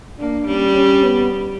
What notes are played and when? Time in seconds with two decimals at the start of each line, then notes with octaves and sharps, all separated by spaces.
0.20 A#3 D4
0.47 G3 C#4
0.76 C#4
1.04 B3